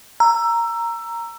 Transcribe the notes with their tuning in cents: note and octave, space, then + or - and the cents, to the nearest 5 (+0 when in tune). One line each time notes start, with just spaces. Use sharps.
A#5 +0 E6 +20